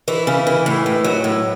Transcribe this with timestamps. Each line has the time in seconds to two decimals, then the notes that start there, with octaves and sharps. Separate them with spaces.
0.08 E3 E4
0.27 C#3
0.47 E3
0.66 A2
0.86 A2
1.04 F#3
1.24 A2